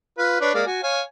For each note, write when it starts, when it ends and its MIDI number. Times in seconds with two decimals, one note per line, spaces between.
0.18 0.38 65
0.18 0.38 71
0.41 0.52 62
0.41 0.52 71
0.41 0.52 73
0.54 0.62 56
0.54 0.62 58
0.54 0.62 74
0.66 0.81 66
0.66 0.81 80
0.83 1.02 73
0.83 1.02 77
0.83 1.02 80